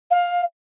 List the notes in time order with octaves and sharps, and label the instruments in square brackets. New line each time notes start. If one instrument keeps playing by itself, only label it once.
[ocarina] F5